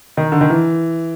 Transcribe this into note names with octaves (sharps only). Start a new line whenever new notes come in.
D#3
D3
D#3
E3